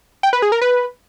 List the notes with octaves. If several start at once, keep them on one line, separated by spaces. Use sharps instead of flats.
G5
B4
G#4
A#4
B4